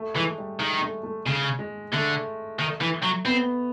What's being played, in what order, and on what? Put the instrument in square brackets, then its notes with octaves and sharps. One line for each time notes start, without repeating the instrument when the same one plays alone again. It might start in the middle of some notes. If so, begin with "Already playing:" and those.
Already playing: [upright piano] A3
[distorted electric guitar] E3 [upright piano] G#3
[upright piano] G3
[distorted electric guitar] D#3 [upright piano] G#3
[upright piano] A3
A3
[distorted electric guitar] C#3 [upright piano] G#3
[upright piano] G#3
[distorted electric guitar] D3 [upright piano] A3
[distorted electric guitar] D#3
E3
F#3
[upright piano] B3 [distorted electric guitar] C4